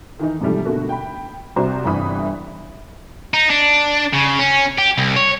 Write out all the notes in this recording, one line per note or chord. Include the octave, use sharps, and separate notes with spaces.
D#3 E3 D#4
G#2 C3 E3 F3 G3 A3
B2 D3 A3 A#3 F#4
G5 B5
C2 C3 F#4 C5 A#5
G1 G2 C3 E3 B5 D#6
D#4
D4
C#3
C#4
G4
C2
C#5